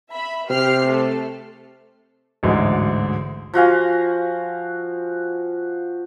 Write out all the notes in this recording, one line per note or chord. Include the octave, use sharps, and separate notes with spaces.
E5 B5
C3 G4 F6 C7
A3 A4
A1 D2 G#2 D3 D#4 F#4
F3 F#4 F5 G#5